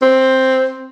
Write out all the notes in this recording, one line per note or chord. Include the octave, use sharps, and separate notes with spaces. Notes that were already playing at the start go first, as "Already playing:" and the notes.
C4